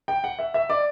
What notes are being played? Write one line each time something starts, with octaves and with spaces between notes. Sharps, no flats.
G5
F#5
E5
E5
D5